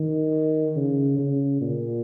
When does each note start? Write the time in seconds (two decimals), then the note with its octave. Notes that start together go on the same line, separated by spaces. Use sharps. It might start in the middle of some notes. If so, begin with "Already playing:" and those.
Already playing: D#3
0.76 C#3
1.18 C#3
1.61 A#2